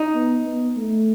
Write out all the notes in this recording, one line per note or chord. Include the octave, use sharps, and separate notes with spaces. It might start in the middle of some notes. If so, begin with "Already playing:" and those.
Already playing: D#4
B3
B3
A3